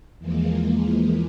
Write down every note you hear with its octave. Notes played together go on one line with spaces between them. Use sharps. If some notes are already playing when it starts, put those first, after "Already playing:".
E2 E3 F3 G#3 A#3